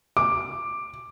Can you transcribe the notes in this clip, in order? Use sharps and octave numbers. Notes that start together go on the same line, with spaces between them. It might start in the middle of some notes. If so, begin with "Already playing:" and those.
D6